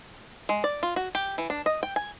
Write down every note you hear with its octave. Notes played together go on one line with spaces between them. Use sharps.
G#3
D5
F4
F#4
G4
E3
D4
D#5
G5
G#5